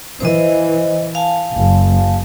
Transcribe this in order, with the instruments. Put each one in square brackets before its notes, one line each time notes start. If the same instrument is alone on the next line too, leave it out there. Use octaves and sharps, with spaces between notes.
[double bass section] E3 [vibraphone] C5 D#5
[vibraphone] F5 G#5 A5
[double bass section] F#1